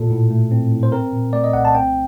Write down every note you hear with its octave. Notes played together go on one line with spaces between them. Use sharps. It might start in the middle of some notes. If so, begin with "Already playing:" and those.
Already playing: A#2 A4
A2
A3
C4
A2
C5
C4 A#4
A#2
A3 D5
D#5
C2 F#5
A5
C4 G5